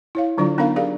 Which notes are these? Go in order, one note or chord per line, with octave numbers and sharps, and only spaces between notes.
E4 C#5 F5
D3 F#3 D4 F4 D5
B3 D4 D#4 A#4 F5 A#5
G4 G#4 A#4 D5 F5